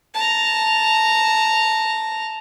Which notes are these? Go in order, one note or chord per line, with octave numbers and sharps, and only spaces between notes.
A5 A#5